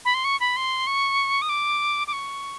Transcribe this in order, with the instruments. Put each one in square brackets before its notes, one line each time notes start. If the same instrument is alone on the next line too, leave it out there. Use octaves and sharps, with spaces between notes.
[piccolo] B5
C6
C#6
B5
C6
C#6
D#6
D6
D6
C#6